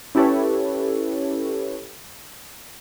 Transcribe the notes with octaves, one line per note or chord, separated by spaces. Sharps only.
C#4 E4 G4 A4 B4 C#5